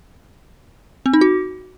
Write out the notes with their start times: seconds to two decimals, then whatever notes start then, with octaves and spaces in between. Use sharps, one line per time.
1.06 C4
1.13 D#4
1.21 F#4